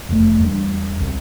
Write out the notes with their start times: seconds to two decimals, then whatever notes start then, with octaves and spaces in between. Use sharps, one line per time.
0.09 F1 E2 C3 A3
0.40 E2 G3 D4
1.01 C2 C3